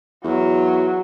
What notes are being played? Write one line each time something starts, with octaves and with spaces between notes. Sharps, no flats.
E2 F#3